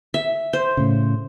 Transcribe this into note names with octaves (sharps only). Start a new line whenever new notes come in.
E5
C5
A2 C#3